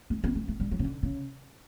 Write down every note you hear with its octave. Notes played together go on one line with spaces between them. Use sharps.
A3
B3
A3
A3
G3
F#3
C#3
D3
C#3